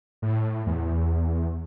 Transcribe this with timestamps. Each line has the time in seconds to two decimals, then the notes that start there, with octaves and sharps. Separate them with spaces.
0.22 A2
0.66 E2